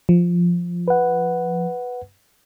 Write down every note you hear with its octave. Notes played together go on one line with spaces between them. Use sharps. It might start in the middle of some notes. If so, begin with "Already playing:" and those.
F3
B4 F#5